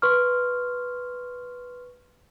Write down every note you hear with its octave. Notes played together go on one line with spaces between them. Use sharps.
B4 C6 C#6 F6